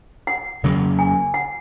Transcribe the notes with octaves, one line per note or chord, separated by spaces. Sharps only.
F#5
F2 C#3 F#3 A#3
G#5
F#5